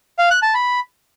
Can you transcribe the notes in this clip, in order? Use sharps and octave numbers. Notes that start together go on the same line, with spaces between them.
F5
F#6
A5
B5